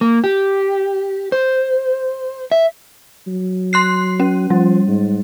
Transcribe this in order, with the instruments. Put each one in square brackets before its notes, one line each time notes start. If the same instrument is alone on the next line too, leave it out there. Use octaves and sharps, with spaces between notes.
[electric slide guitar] A#3
G4
C5
E5
[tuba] F#3
[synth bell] C6 F#6 C7
C#4
[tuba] F3 [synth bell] G3
[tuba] G#2